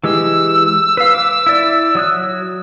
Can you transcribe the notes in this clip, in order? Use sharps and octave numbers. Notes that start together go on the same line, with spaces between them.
E3 G#3 G4 E6
B4 F5
D6
E4 D5
F#3 D#6 F#6